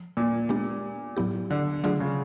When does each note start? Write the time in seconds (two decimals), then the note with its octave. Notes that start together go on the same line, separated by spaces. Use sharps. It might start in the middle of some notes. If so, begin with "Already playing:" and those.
Already playing: F3
0.17 A#2
0.49 G#3 B3 D4 G4
1.17 A2 F#3 B3 E4 G4
1.51 D3
1.84 D3 F#3 A3 D4 F4 G#4
2.00 C#3